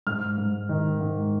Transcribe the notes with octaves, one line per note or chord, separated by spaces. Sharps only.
G#2 F6
G#2
D#3
G#2